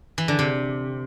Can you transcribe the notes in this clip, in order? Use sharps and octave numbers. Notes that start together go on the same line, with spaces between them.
E3
D3
C3